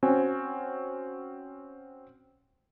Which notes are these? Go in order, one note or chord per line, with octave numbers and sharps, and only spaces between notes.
C4 C#4 F#4 G#5